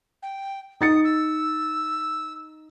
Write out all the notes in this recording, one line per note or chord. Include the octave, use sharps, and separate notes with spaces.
G5
D#4 D#6 A6 C#7
E6